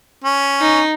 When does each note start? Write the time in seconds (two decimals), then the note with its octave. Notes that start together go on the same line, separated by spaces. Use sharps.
0.24 C#4
0.61 D#4